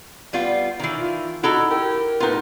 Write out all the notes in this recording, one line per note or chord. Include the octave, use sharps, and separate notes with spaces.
G3 B3 F4
D#3 E3
F4
D#4 E4 F#4 A4 A#5
G4 A#4
A2 B3 D#4 F4 B4